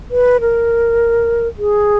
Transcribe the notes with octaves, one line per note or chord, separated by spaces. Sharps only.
B4
A#4
G#4